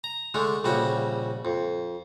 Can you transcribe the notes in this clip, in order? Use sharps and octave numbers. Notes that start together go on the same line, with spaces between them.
A#5
D3 G#3 A3 D4
A#1 C#3 G3 F#4 E5
F2